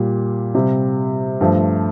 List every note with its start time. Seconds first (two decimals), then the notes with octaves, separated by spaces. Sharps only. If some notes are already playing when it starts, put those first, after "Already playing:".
Already playing: A#2 G3
0.55 C3 G3
1.41 G2 F3 A3